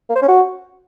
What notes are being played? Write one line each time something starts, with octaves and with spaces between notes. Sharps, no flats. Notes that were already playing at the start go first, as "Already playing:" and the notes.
A#3
C5
C#4
F#4